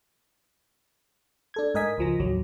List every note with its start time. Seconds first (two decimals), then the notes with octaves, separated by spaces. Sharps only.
1.54 D4 A4 G#6
1.74 G#2 A#4 D#5 G#5 B6
1.98 C#2 F3 A#6
2.19 A1 D#2 F#3